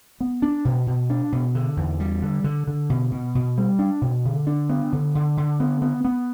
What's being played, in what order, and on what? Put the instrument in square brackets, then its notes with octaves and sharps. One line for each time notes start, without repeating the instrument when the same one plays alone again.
[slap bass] B3
D4
B2
B2
D4
B2
D3
E2
G3
D3
D3
D3
B2
B2
B2
G3
D4
B2
D3
D4
B3
D3
D3
D3
B3
B3
B3